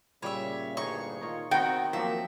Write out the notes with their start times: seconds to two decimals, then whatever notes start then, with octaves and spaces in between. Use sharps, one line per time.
0.23 A#2 C#3 G3 C#5 E5
0.77 D2 G2 D#4 G#4 C#5 C#6
1.21 D#3 D#4 F4 C#5
1.51 D#3 B3 C4 F#4 G5 A#5
1.93 F3 F#3 A#3 C4 E5